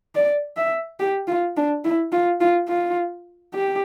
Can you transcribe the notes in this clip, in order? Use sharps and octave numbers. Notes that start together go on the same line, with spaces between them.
D5
E5
G4
F4
D4
E4
F4
F4
F4
G4